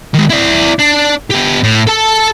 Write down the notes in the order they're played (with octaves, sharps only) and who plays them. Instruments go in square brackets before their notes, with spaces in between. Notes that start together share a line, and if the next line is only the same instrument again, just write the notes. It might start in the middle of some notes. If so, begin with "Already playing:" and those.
[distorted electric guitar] D#3 G#3
E4 D5
D4
B3 G4
A2
A4 A5